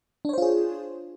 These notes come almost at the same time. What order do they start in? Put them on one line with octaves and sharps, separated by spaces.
D4 C#5 C5 F4 G#4